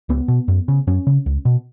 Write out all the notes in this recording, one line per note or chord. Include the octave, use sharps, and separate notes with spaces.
C#2 B3
B2
F#2
C#3
F#2 C#4
C#3
C#2
B2